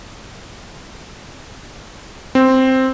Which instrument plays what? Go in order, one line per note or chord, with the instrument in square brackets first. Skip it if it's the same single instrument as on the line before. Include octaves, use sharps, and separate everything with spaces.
[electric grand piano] C4